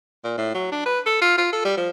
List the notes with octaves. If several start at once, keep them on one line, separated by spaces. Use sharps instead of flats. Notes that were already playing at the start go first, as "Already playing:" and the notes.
A#2
A2
F#3
D4
B4
A4
F4
F4
A4
G3
F3